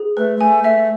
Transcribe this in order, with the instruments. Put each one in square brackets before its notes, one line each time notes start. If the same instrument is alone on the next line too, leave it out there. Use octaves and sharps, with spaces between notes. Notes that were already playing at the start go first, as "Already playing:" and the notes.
Already playing: [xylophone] G#4
[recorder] A3 [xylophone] B4
[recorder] G#3
[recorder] A3 [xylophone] G#5
[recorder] A3 [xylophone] E5